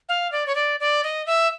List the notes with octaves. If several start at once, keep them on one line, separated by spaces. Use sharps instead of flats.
F5
D5
C#5
D5
D5
D#5
E5